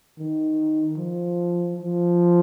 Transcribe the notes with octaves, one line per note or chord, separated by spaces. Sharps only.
D#3
F3
F3